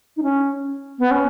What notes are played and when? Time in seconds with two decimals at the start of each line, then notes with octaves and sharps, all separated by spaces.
0.17 D#4
0.22 C#4
0.99 B3
1.11 C#4